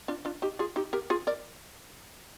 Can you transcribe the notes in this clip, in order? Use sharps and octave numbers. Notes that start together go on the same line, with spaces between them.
D4 F4
D4 F4
D#4 G4
F4 G#4
D#4 G4
G4 A#4
F4 G#4
A#4 D5